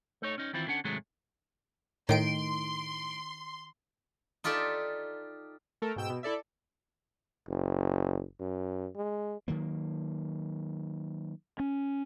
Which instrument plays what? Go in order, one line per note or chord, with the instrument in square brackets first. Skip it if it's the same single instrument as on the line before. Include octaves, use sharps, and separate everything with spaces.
[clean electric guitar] A3 D#4 C#5
C#4 D#4
D#3 E3 C4 E4 F4
D3 C#4 D4 F#5
G#2 C3 D#3 F#3 G#3 A3
[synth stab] A2 D7 [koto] D#3 G5 [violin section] C6
[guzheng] D#4 F4 G4 A4 D5 E5
[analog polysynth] A3 A4 A#4
G#2 B2 G5 E6 E7
B2
E4 A4 D5 E5
[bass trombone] F#1
F#2
G#3
[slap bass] D#3 F#3 A#3
[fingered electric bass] C#4